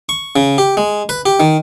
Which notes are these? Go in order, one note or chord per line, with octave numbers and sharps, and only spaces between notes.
C#6
C#3
G4
G#3
B4
G4
D#3